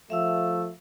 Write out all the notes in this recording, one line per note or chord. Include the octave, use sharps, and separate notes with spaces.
F3 A3 E5 F5 E6